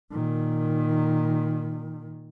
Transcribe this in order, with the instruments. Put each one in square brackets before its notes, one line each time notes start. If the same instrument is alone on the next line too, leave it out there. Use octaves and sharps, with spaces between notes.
[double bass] A#2 D#3